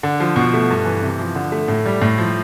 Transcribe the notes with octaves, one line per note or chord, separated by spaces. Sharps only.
D3
F3
B2
A3
G2
E3
C3
F3
D3
A3
A2
G3
A2
F3